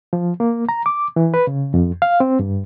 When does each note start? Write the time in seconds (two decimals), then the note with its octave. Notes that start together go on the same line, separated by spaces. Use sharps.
0.13 F3
0.40 A#3
0.69 A#5
0.86 D6
1.16 E3
1.34 B4
1.47 C#3
1.74 F2
2.02 F5
2.20 C4
2.39 G2